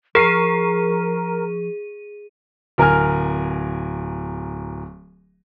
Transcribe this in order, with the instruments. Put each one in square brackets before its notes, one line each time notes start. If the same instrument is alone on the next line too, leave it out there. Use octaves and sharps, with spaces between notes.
[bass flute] F3 [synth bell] G#4 D#7 [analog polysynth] A#4 [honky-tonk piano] C#6 C7
[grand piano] D1 A#4 G#5 F6